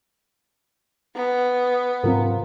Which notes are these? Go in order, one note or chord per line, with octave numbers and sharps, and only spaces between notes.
B3
G#2 C3 F#3 C4 F4 A#4